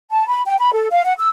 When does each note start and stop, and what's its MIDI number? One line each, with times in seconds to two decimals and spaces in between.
0.11 0.27 81
0.27 0.40 83
0.46 0.58 79
0.58 0.72 83
0.73 0.87 69
0.91 1.02 77
1.04 1.13 78
1.18 1.28 88